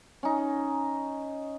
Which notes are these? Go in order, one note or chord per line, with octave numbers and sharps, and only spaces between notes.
C#4 D#4